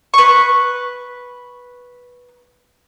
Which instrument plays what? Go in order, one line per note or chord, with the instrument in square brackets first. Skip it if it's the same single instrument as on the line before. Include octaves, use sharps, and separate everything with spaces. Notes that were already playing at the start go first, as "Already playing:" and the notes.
[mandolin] B4 C#6